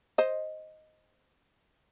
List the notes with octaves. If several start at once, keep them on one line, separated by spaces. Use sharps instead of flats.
C5 D#5